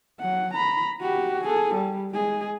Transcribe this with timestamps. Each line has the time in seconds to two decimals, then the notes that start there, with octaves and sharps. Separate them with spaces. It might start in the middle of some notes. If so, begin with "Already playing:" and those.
0.20 F#3 F#5
0.54 A#5 B5
1.00 F#4 G4
1.43 G#4 A4
1.74 G3
2.12 G#3 G#4